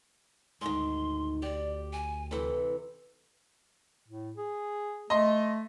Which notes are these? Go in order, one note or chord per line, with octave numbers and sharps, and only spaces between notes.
D2 G#2 D#3 C6
G4 D5
G#5
C3 E3 A4
A2
G#4
A3 D#5 C6